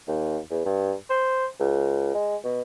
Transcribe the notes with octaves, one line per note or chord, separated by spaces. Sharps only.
D#2
E2
G2
C5
C#2
G#3
B2